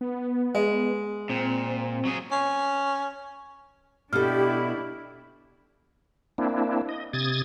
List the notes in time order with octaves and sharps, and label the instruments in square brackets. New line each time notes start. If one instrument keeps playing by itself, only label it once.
[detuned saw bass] B3
[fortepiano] G#3
[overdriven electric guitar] A#2 [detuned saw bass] C4
[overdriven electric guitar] F#3 G#4
[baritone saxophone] C#4
[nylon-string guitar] B2 A4 [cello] D4 E4 [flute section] G4 [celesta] F6
[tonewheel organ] A#3 C4 D4 E4
D#5
C3 D#6 G#6 A6